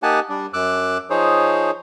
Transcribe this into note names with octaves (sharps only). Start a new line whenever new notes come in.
A#3 D#4 G4 F#5 G#5 A5
G3 D4
F#2 D6 E6 F#6
F3 D#4 G#4 C5 C#5